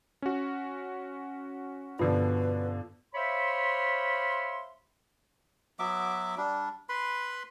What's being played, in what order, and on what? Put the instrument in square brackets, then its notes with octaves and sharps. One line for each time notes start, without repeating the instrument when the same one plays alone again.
[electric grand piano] C#4 F#4
[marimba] G2 [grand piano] B2 D3 F3 [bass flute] B4
[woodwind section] C5 C#5 E5 F5 B5 C6
[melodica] F#3 B3 E5 D6
G3 D4
B4 B5 C6